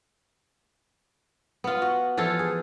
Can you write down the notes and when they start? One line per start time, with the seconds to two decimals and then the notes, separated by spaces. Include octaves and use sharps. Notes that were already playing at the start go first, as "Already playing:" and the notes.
1.64 B3 F4
1.82 F#4
2.17 E3 F3 F4 A4
2.39 G#4